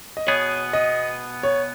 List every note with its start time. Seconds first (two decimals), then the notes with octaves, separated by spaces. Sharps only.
0.17 D#5
0.27 B2 B3 G#4 C#5
0.73 D#5
1.43 C#5